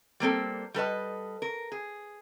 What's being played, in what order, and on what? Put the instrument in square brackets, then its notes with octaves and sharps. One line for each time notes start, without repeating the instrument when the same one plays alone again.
[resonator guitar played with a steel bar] G3 A#3 C4 A4
G3 A4 B4 D#5
A#4
G#4